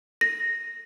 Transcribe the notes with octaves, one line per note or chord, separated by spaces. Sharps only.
A#6